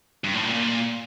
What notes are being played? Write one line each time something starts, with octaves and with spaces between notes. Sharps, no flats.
G2
A2
A#2